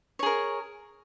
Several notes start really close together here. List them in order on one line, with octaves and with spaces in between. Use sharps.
C#5 G#4 A#4